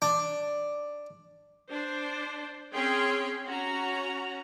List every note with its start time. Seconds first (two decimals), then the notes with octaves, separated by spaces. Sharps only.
0.02 D4
1.72 D4 C5
2.73 C4 C#4 G#4 G5 C6
3.45 C#4 F#4 A#5